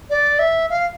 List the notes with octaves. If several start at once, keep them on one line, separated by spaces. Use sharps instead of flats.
D5
E5
F5